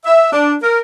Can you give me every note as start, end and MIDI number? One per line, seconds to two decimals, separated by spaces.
0.05 0.30 76
0.32 0.55 62
0.62 0.79 70